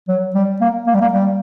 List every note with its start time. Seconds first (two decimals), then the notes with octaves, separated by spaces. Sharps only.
0.08 F#3
0.35 G3
0.61 A#3
0.87 A#3
0.94 G3
1.01 A#3
1.13 G3